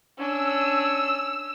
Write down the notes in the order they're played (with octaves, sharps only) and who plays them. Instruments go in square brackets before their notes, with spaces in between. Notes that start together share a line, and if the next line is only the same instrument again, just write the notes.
[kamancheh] C#4 D4 [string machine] E6